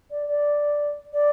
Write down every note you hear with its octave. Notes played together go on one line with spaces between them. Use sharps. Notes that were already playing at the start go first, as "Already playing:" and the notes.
D5
D5
D5